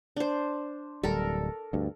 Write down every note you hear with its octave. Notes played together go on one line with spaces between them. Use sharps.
D4 C5
D1 G3 A4 A#4
D2 G2